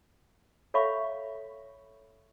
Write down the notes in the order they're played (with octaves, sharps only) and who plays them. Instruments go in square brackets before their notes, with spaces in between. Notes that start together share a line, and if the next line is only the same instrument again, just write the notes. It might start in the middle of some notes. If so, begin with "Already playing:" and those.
[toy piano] A4 C#5 E5 F5 B5 C#6